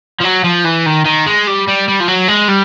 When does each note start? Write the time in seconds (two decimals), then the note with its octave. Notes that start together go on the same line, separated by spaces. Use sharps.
0.21 F3
0.25 F#3
0.44 F3
0.65 E3
0.86 D#3
1.06 D#3
1.26 G#3
1.47 G3
1.68 G3
1.88 G3
2.00 F3
2.08 F#3
2.28 G#3
2.48 G3